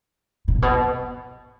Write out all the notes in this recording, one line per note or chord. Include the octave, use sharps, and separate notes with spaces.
A2
A#2
B2